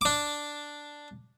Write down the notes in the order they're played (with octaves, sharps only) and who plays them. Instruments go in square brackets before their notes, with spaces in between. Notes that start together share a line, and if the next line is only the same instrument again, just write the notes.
[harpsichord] D4 D6